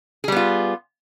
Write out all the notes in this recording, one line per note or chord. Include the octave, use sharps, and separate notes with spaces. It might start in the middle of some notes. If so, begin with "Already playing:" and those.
G3 B3 F4 G#4